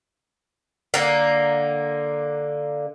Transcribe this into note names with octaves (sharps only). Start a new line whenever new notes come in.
D3 A#3